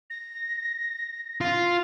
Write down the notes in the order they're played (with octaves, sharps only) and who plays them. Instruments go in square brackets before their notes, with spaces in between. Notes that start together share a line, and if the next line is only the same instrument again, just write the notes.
[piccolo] A#6
[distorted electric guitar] F4